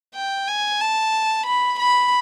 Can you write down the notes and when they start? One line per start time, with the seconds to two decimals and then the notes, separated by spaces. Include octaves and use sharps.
0.15 G5
0.48 G#5
0.81 A5
1.46 B5
1.79 B5